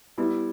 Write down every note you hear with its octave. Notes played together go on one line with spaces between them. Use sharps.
G3 B3 E4